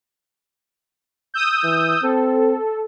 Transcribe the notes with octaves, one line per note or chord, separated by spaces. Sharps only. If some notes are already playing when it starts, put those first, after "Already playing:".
D#6 E6 G6
E3
C4 A4